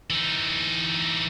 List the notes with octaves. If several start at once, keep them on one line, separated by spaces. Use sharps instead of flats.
E3 D#4